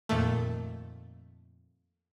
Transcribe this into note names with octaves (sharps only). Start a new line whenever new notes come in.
F2 A#2 D#3 A3